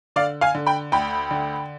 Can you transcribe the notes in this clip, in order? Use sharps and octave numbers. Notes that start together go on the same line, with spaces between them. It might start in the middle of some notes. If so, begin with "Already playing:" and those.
D3 D5 F5
F5 G#5
D3
G5 B5
D2 G5 B5
D3